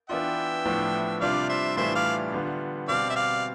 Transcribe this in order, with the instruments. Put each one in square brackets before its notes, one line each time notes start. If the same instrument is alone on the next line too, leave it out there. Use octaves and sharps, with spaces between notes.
[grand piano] E3 B3 D4 F4 [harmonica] E5 G5
[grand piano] A2 F3 B3 D4
[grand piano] C3 G3 D4 F4 [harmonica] D5 F5
[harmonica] C5 E5
[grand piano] A2 E3 G3 D4 F4 [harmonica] C5 E5
[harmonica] D5 F5
[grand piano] D3 G3 B3 F4
[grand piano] B2 G3 C4 [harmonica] D5 F5
[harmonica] E5
D5 F5